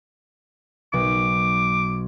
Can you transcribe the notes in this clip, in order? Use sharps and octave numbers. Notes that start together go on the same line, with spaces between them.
B1 D6